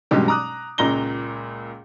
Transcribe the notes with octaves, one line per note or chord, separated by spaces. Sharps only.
A1 G2 B2 F#3 G#3 G4
A#5 D6 D#6 F#6
C#2 A#2 A#3 A#5 A#6 G7